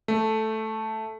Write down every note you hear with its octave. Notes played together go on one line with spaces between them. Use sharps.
A3